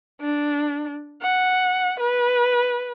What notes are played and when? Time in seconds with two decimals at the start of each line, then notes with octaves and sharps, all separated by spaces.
0.21 D4
1.22 F#5
2.00 B4